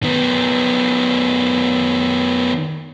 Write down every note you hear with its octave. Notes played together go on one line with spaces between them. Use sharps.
D#3 B3